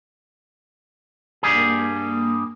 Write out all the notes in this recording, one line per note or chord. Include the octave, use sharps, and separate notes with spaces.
G2 G3 A#3 G#4